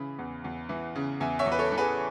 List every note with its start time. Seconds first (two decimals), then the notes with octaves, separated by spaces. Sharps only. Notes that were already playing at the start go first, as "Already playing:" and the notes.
Already playing: C#3 E3 B5
0.19 E2
0.44 E2
0.69 E3
0.95 C#3
1.20 E2 E5 G#5
1.39 C#5 E5
1.46 E2
1.52 B4
1.59 A4 C#5
1.72 E3
1.78 G#4 B4